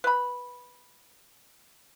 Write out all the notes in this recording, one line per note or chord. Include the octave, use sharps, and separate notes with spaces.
B4 B5